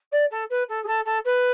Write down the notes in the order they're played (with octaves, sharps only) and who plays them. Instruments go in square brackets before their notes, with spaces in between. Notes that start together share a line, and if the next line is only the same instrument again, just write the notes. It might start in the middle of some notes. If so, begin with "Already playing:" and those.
[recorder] D5
A4
B4
A4
G#4
A4
A4
B4